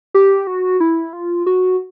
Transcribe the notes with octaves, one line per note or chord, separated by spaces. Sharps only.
G4
F#4
E4
F4
F#4